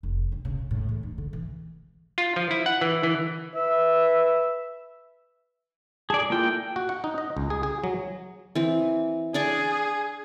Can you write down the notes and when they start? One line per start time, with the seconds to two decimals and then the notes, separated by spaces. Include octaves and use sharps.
0.03 F1
0.32 C3
0.45 C#3
0.59 A2
0.71 A2
0.89 E2
1.03 D#4
1.18 D3
1.33 E3
2.18 F4
2.36 F3
2.51 E4
2.66 F#5
2.81 E3
3.03 E3
3.55 B4 E5
6.10 G#4 D5 A5
6.30 A#3 E4 F4 A4 G5
6.76 F#4
6.89 F#5
7.04 D#4
7.18 D#5
7.37 C#2
7.50 G#4
7.63 G#4
7.84 F#3
8.55 E3 C4
9.34 D4 G#4 D5 C#6